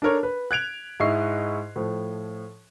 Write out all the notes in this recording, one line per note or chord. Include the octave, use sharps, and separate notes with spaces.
D4 A4 A#4 C#5
B4
F#6 G#6 D7 F7
G#2 E4 D#5 C#6 C7
A2 F3